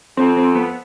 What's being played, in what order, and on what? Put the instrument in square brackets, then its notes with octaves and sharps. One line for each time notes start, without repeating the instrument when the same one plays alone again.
[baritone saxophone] F2 [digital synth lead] C4
[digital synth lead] C4
B3